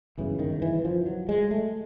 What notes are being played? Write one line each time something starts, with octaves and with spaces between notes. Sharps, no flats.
G1 F#2 C#3 E3
D#3
E3
F3
F#3
G#3
A3